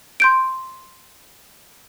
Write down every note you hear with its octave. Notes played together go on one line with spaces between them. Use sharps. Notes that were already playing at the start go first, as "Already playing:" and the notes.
C6 G6 D7